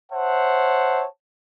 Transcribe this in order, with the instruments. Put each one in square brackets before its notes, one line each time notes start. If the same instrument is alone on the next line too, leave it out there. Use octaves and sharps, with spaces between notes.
[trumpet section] C5 C#5 E5 F#5 A5